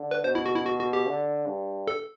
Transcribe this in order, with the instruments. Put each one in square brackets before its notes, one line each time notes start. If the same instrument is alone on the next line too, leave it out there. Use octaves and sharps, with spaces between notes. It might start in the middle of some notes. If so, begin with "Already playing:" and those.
Already playing: [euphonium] D3
[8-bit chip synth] B4
[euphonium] B2 [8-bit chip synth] C5
[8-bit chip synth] E4
F#4
E4
F#4
F#4
G4
[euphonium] D3
G2
[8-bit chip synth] A4